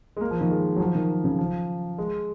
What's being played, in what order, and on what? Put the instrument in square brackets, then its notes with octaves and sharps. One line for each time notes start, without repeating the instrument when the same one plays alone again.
[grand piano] G#3
A#3
F3
D#3
G#3
F#3
F3
D#3
C#3
F3
G#3